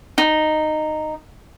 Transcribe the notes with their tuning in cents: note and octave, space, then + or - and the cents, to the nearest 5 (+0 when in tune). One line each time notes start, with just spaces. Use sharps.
D#4 -10